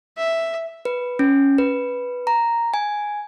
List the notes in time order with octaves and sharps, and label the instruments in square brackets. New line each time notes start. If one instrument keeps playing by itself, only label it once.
[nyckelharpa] E5
[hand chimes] B4
C#4
B4
A#5
G#5